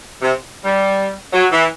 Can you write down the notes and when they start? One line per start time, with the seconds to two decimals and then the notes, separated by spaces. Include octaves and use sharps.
0.22 C3
0.64 G3
1.33 F#3
1.51 E3